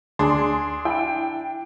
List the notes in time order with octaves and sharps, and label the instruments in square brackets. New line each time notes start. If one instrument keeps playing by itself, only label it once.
[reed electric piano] D2 [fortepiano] D4 [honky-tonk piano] G#4 C6
[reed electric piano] E4 [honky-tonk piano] G5